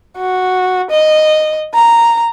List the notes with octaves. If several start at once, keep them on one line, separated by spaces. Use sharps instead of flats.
F#4
D#5
A#5